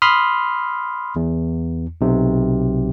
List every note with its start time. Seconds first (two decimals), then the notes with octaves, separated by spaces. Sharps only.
0.02 B5 C6 D#6 F6
1.16 E2
2.01 B1 C3